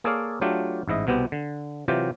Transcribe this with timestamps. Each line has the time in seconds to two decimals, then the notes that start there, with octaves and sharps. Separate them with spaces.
0.04 A#3 G#4 A4 C#5 D5 F5
0.41 F#3 A3 D4 F4 G4
0.88 A1 G#2 E4 D#5
1.07 C2 B2 B3 C4 G4
1.32 D3
1.88 C3 E3 F#3 F4 G4